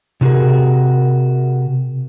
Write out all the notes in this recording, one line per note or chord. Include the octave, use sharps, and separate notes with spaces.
C3 D#4 F#4 G#4 A#4